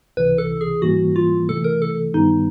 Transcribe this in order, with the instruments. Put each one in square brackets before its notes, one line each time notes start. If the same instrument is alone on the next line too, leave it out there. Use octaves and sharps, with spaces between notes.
[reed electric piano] C#2 C3 E3 [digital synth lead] B4
[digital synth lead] A4
G#4
[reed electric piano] G#2 E3 G3 A#3 [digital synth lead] F#4
[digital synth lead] F4
[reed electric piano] C3 E3 A3 [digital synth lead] A4
[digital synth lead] A#4
A4
[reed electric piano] G2 D#3 G3 B3 [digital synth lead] D#4